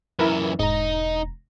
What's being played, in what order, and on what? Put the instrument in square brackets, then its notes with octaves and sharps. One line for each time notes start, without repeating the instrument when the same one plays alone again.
[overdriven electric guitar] F#2 E3 [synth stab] E4 A#4 B4
[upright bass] E1 [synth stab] G#2 A#5 [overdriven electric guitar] D#4